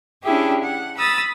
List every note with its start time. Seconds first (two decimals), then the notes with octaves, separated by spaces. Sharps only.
0.23 C#4 D4 E4 G4 G#4
0.62 F#5
0.96 B5 D#6 E6 A6